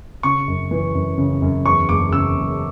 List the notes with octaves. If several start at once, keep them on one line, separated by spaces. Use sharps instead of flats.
C#3 C#6
F#2
E3
F#2
C#3
F#2
E2 C#6
F#1 D6
C#3 E6
F#1